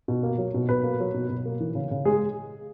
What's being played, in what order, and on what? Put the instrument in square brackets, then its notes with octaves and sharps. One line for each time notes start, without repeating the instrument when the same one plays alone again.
[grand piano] B2
A#3
F#3
B2
B2 B4
A#3
F#3
B2
B2
A#3
E3
C#3
C#3
G#3 G#4